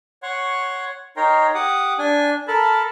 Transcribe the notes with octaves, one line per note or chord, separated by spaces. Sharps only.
C#5 F#5 C6 C#6
D#4 A#4 C#5 G5 A#5 C6
G4 F#5 D6 D#6
D4 G#5
A4 A#4 A5 B5